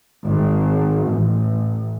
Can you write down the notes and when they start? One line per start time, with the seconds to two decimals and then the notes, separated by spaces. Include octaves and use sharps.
0.23 G#1
1.06 A1